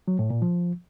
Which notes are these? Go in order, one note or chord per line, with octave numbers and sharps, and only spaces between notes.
F#3
A2
A#2
F3